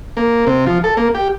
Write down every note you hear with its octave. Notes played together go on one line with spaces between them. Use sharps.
A#3
C3
F3
A4
A#3
G4